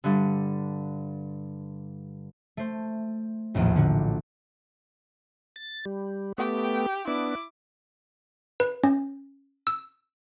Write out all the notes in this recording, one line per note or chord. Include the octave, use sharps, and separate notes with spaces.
G2 D3
A3 C5
D#1 A#1 E2 A2 A#3
D3 F#4
A6
G3
A3 B3 G4 G5
B3 D4 E4 D6
B4
C#4
E6